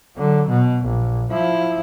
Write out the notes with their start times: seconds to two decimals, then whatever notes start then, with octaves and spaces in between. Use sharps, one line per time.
0.16 D3 F#3
0.50 B2
0.86 A#1
1.32 F3 E4